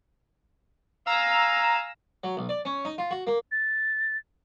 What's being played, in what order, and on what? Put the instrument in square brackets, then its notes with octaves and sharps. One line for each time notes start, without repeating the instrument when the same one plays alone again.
[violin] F5 G#5 [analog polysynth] A#5 E6
[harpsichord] F#3
B1
D5
C#4
D#4
F4
F#4
A#3
[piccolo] A6